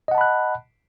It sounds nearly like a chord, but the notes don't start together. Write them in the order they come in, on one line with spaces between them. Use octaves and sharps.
D#5 F#5 A5 B5 F#6